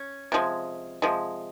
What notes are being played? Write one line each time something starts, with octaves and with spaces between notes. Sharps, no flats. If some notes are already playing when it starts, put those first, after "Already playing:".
Already playing: C#4
C3 F3 G#3
C3 F3 G#3